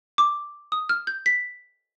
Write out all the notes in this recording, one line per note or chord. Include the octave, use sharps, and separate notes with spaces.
D6
D#6
F6
G6
B6